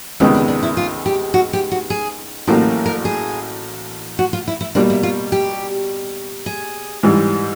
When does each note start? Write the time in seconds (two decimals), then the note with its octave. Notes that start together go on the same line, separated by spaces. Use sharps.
0.20 C#2 C3 D#3 G#3 B3 C#4
0.34 D4
0.48 D4
0.63 E4
0.77 F4
1.06 G4
1.34 F#4
1.53 G4
1.71 F#4
1.90 G#4
2.47 A1 A2 F#3 A#3 G4
2.86 A#4
3.05 G#4
4.19 F#4
4.33 F4
4.48 E4
4.61 E4
4.75 B2 G3 A#3 D4
4.90 E4
5.03 F4
5.32 G4
6.46 G#4
7.03 G#2 E3 G3